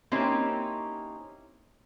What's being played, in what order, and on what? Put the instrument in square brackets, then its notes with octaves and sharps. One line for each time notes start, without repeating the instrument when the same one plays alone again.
[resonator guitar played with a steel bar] A#3 C4 C#4 D#4 E4 G4